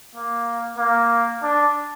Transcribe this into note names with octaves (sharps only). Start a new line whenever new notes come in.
A#3
A#3
D4